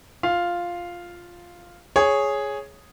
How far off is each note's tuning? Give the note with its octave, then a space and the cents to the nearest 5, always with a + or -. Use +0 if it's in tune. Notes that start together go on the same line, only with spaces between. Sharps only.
F4 +0 F5 +0
G#4 +0 C#5 +0